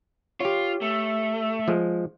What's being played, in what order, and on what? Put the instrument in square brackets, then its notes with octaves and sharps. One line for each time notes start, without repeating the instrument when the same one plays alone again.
[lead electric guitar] F4 [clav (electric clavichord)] G4 C#5
[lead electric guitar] A3
[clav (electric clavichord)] F3 G#3